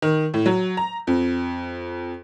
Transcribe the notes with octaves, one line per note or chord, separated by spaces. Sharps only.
D#3
A2
F#3
A#5
F2